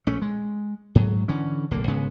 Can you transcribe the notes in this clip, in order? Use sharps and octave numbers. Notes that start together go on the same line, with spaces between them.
A#1 A3 C#4
G#3
G#2 F#3
D3 E3 C#4
D1 B1 D3 A#3
G#1 C#3 G#3 B3